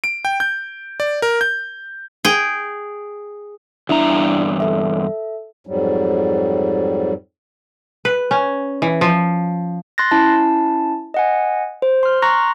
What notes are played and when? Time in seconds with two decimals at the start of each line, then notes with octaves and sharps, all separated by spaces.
0.04 D7
0.25 G5
0.40 G6
1.00 D5
1.22 A#4
1.41 G6
2.25 G#4 G5
3.89 E2 G2 D4 E4 E5 A#5
4.60 A4 E5
5.67 F2 G#2 F#3 G3
8.05 B4
8.31 C#4
8.82 E3
9.01 F3
9.98 C6 F#6 A6 A#6
10.11 C#4 E4 A5
11.14 D#5 F#5 G#5
11.82 C5
12.03 C6 F6
12.22 A#5 C6 C#6 F#6 A#6